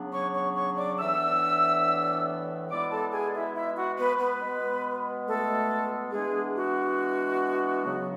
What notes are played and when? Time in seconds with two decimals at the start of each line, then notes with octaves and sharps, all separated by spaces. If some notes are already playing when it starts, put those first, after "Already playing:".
Already playing: C#3 F#3 B3 D4
0.13 C#5 C#6
0.35 C#5 C#6
0.56 C#5 C#6
0.78 D5 D6
0.99 A2 E3 B3 D4 E5 E6
2.70 B2 G#3 B3 E4 D5 D6
2.91 A4 A5
3.13 G#4 G#5
3.29 D5
3.35 E4 E5
3.56 E4 E5
3.78 F#4 F#5
3.99 B3 B4
4.20 B3 B4
4.41 B2 G#3 B3
5.27 A3 A4
6.13 E3 G#3 B3 D4 G#4
6.56 F#4
7.85 C#3 F#3 B3